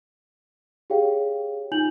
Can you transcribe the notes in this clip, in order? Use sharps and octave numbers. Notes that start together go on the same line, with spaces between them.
G4 G#4 C#5 F5 G5
D#4 F4 G#5 G6 F7 F#7